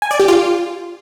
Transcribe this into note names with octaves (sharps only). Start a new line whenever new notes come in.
G#5
D5
G4
F4